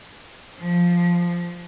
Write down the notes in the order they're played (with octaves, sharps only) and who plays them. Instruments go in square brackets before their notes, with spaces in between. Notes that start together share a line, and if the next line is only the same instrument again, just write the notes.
[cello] F3